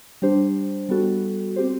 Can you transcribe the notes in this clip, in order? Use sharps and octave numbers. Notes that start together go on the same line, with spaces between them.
G3 D4 G4 C5
G3 B3 F#4 A4
C4 G4 C5